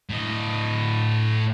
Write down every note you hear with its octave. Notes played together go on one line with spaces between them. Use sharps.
A2 D#5